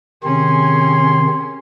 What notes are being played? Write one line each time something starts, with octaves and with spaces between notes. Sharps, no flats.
C3 D#3 C4 C#4 G#4 C6